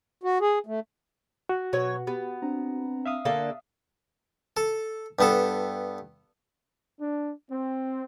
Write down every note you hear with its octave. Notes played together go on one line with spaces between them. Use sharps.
F#4
G#4
A3
F#4
B2 F#3 B4 C#5 F#5
B3 G4
C4 D4 A#5
E5 F5 D#6
D3 A#3 A4
A4
G2 B3 A4
D4
C4